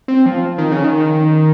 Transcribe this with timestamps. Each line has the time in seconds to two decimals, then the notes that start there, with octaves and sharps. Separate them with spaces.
0.08 C4
0.26 F3
0.58 D#3
0.72 C#3
0.84 D#3